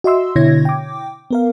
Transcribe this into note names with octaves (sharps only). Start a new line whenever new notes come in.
F#4 D#5 E5 C6 E6
B2 D3 E4 C#5 G#6 A#6
G5 D6
B3 A#4 F5